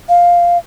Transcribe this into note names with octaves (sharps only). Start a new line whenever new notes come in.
F5